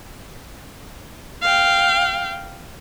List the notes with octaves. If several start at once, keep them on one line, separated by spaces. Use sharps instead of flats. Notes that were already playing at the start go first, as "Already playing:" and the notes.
F5 G5